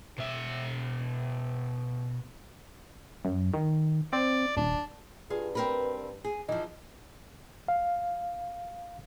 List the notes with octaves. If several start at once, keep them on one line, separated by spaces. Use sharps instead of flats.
B2 E5
F#2
D#3
C4 D5
D#1 D4
G2 F4 G#4
C4 A#4 B4
G#4
E3 F3 D#4
F5